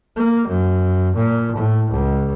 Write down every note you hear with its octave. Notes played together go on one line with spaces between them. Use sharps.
A#3
F#2
A#2
A2
C#2